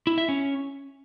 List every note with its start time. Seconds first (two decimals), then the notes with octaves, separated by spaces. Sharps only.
0.07 E4
0.18 E5
0.29 C#4